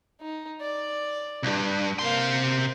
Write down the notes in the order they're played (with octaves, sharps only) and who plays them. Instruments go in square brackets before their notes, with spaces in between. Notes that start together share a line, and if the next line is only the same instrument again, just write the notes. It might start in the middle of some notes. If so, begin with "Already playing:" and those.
[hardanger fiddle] D#4
D5
[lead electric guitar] C2 G2
[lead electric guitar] C3 C6 [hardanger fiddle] A#3 F5